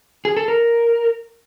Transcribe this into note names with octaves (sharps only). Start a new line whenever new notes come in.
G#4
A4
A#4